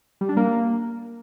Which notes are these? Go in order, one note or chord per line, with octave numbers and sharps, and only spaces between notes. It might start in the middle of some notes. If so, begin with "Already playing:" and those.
G3
D4
A#3